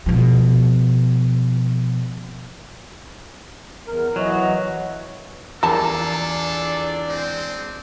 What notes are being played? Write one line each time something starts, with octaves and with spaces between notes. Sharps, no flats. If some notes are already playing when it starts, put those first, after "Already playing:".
B2 F3
E2 A#4
E3 F#3 F#4 D#5
E2 G3 D4 F4 A4 A#4 D5 A5
G#3 C4